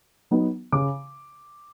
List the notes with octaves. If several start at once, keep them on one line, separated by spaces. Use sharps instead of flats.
F#3 B3 D#4
C#3 D6